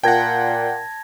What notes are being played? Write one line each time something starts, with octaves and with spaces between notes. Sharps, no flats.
A#2 F#5 G5 A5 G#6 A#6